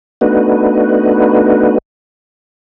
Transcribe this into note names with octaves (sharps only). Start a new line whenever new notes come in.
A3 B3 D4 D#4 F#4 B4